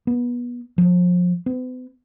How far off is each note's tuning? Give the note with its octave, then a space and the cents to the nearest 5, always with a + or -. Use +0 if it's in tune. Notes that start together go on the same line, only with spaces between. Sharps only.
B3 -25
F3 +30
B3 +45